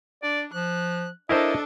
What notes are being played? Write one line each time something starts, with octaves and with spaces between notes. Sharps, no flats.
D4 D5
F3 F#6
D4 E4 A4 A#4 C5 D#5